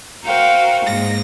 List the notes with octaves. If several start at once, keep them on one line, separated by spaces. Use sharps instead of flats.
F#4 A#4 C5 F5 G5
G#2 A#3 A#6